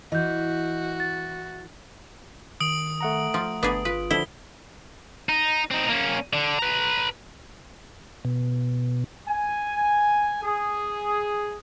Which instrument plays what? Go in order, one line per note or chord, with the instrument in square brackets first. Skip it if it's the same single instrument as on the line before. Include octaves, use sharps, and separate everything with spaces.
[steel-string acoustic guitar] E3 [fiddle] F#4 [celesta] D#5 G6
[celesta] A6
[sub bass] D#3 [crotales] D#6 D7 F#7
[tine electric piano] A3 F#5 A#5
[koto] F3
[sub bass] G1 [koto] B3 D4 G#4
[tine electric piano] F4 [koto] B4
[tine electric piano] D3 F3 D4 [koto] E4 [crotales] G7
[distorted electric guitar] D#4
C4 D#4
A#3 C#4
D3
B4 A#5
[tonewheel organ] B2
[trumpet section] G#5
G#4